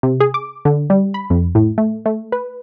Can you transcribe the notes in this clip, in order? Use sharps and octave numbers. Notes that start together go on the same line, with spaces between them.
C3
G#4
D6
D3
G3
B5
F2
A2
A3
A3
B4